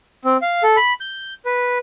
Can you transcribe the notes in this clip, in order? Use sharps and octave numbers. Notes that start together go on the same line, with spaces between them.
C4
F5
A4
B5
G6
B4